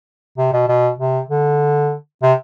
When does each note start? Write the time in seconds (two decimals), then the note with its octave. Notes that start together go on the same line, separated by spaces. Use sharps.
0.38 C3
0.53 B2
0.68 B2
0.99 C3
1.30 D3
2.22 C3